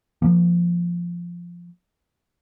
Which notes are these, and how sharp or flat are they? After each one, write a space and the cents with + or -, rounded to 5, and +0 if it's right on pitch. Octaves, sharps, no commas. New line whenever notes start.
F3 -5 A#3 +0